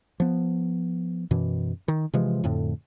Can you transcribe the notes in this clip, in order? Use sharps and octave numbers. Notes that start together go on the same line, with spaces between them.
F3 B3
F#2 B2 E3
D#3
C3 E3 F3 G#3
F2 A2 D3